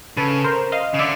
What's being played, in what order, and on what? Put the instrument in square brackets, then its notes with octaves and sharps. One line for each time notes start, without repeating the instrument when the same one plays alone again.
[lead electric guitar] C#3 [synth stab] A4 B4
[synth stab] A#4 C5
D#5 F5
[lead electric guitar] C#3
[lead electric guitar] D3 [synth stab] D5 E5